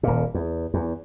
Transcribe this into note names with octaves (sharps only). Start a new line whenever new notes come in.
D#1 A#2
E2
E2